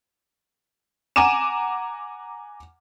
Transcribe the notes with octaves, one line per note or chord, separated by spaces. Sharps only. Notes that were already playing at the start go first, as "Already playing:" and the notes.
F#5 G#5 A#5 D6 D#7 E7